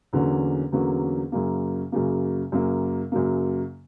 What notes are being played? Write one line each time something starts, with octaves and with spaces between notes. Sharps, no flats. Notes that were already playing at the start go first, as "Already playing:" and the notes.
E2 D3 F#3 A#3 C#4
E2 D3 F#3 A#3 C#4
F#2 C#3 F#3 A#3
F#2 C#3 F#3 A#3
F#2 C#3 F#3 A#3
F#2 C#3 F#3 A#3